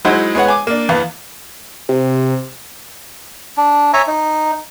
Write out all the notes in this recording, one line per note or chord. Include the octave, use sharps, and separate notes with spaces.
F#3 G#3 D#4 E4 C5 F#5
G#3 B3 C#5 F#5
G#5 D6
A#3 D4
E2 B3 F5
C3
D4
C#5 E5 G#5 A#5
D#4